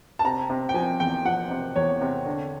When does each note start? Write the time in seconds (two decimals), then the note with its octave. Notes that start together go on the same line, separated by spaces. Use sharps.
0.19 A5
0.24 C3 A#5
0.50 C3
0.69 G5
0.74 F3 G#5
1.00 E2 G5
1.25 F3 F#5
1.51 C3
1.76 E2 C#5
2.01 C3
2.26 D3